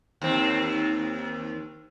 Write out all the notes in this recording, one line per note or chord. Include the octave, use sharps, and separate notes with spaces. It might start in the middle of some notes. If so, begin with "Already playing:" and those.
D#2 C4